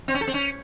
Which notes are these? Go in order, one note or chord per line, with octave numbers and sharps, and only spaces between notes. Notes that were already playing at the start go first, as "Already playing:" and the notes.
C4
C#4
A4
C4
C#4